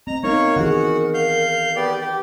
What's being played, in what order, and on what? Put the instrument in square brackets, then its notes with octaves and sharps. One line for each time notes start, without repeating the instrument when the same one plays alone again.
[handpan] C4 [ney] D#5 [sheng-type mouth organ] A#5
[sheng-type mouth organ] A#3 C#5 C#6 [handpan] B3 D#4 D#5 [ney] A#4
[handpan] D#3 E3 G#4 [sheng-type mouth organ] F#4 F#5
[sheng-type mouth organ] F5 G6
B3 G4 D5
G4